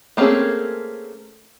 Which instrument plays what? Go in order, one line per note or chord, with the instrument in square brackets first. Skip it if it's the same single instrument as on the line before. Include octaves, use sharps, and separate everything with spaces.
[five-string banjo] A3 A#3 C4 C#4 G#4